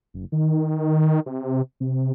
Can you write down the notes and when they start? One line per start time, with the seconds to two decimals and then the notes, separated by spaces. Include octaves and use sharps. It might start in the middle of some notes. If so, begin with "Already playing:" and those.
0.14 F#1
0.32 D#3
1.26 C3
1.80 C3